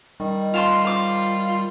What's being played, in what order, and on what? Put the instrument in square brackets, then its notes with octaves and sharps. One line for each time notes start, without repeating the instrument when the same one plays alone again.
[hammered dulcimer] D#3 [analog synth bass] G3
[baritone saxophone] F4 [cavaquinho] F5 A5 C6
[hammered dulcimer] C5 A#5 [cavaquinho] F5 D6